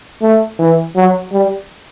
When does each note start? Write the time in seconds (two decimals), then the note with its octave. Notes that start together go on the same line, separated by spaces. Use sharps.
0.22 A3
0.59 E3
0.96 F#3
1.32 G3